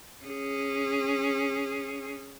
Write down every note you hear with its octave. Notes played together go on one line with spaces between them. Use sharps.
C#4 G#4